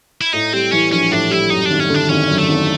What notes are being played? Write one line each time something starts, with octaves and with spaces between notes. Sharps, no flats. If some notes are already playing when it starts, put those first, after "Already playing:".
E4
A2 D#4
G3 C4
E3 C#4
A#1 C#4
A2 D4
G3 E4
F#2 D#4
G#1 D4
C#4
D3 D4
G#1 C#4
F#2
A3
G#1